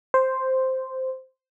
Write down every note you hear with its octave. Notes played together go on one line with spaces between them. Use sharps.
C5